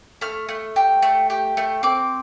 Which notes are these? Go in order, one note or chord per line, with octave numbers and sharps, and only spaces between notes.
A3 F6
A3
G4
A3
G4
A3
C4 D6